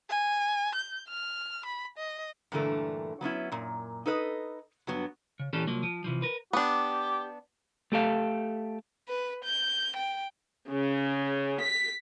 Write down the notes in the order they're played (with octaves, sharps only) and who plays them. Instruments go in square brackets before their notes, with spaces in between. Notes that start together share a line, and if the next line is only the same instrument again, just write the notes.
[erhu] G#5
G6
F6
B5
D#5
[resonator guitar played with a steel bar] G2 A#2 D3 E3 A3 A#4
F#3 B3 C#4 E4
F#2 A#2
D#4 A4 B4 D#5
G2 F#3 B3
[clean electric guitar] C#3
A#2 E3 C#4 G4 A4
C2 F3 F#3 A#3
F3
C3 E3 F3
A#4 B4
[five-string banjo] B3 D4 [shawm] G4
[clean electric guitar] A3 G4 A4 F5
[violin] B4
G6
G5
[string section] C#3
B6